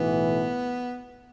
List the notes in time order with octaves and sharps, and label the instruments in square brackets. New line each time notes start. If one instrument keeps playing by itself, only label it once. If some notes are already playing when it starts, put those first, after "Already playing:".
Already playing: [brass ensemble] B1 A2 E3 [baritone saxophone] B3